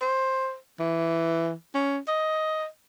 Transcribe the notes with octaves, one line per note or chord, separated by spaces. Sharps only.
C5
E3
C#4
D#5